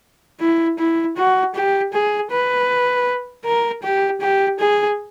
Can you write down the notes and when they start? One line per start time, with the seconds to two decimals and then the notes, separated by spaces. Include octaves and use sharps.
0.40 E4
0.78 E4
1.17 F#4
1.55 G4
1.93 G#4
2.31 B4
3.45 A#4
3.83 G4
4.21 G4
4.59 G#4